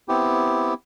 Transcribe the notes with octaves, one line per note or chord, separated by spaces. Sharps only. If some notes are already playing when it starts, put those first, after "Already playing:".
B3 C4 E4 G4